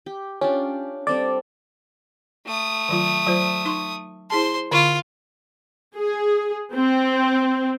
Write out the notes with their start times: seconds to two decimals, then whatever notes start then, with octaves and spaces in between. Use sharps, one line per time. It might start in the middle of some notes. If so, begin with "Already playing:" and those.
0.06 G4
0.41 C#4 D4 F4 G4
1.07 G3 C4 A4 D5
2.46 A3 D#6
2.89 D#3 F#3 F4
3.27 F#3 F4 C5
3.65 D#4 C6 C#6
4.30 E4 G#4 C5 A5 C6
4.71 D3 F4 C#6
5.95 G#4
6.74 C4